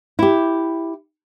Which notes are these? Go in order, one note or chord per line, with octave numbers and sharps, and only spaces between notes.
E4 G4